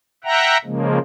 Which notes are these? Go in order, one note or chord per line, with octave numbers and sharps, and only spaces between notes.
E5 F#5 G5 A#5
C#3 F3 G#3 A#3